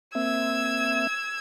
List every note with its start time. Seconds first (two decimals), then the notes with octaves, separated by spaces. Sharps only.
0.15 A#3 C4 E5 E6 G#6